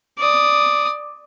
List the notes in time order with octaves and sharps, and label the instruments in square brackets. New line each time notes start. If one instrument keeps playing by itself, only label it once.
[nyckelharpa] D5 D#6